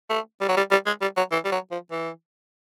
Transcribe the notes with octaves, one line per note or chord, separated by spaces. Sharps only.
A3
G3
F#3
G3
G3
G#3
G3
F#3
E3
G3
F#3
F3
E3